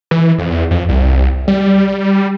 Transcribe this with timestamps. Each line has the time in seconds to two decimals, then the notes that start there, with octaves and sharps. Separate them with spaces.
0.11 E3
0.38 F2
0.50 E2
0.71 F2
0.89 C2
1.48 G3